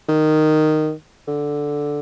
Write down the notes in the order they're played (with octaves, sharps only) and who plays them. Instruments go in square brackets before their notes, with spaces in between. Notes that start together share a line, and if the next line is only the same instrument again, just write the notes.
[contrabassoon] D#3
D3